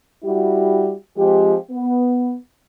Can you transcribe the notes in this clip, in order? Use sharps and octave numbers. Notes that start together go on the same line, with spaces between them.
G3 E4 F#4 G4
F3 G#3 C4 G4
B3